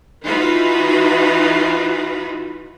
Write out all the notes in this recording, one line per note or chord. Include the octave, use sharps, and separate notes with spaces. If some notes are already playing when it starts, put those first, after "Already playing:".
E3 D#4 F4 F#4 B4